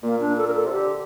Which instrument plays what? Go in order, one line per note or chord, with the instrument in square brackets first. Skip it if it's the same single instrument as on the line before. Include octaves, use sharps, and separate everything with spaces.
[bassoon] A#2 [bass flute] A#3
[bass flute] D4
A4
A#4
A4
[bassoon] C3 [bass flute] F4
[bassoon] D3 [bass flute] G4